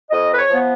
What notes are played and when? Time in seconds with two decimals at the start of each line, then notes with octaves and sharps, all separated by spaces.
0.11 F2 D#5
0.33 B4
0.37 C#5
0.49 F3 B3